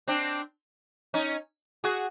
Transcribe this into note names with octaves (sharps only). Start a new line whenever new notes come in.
C4 D4
C#4 D#4
F#4 G#4